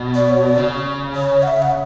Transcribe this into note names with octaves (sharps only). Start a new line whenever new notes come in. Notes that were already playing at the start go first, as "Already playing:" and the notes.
Already playing: B2
D5
C#5
D5
C#3
C#5
F#5
E5
F#5